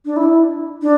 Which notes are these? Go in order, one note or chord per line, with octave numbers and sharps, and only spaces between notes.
D4
E4
D4